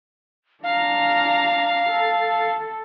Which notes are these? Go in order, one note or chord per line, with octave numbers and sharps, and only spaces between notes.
D4 F5 A#5
A4